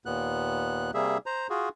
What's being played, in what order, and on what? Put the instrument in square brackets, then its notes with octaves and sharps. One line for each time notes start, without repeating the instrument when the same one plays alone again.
[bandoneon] D#2 A#2 B3 F#6
C3 G3 A#3 G#4 E5
C5 A#5
F4 F#4 G#4